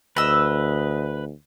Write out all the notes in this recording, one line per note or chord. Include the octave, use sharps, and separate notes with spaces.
D2 B4 D#5 E6